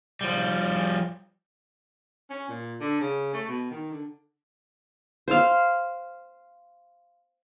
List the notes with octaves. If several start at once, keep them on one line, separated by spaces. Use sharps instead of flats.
F3 G3
C#4
A#2
D3
C#3
A3
B2
D#3
D3
C5 F5